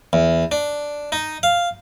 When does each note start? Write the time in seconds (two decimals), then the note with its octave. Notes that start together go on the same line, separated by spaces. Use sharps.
0.13 E2
0.52 D4
1.12 D#4
1.43 F5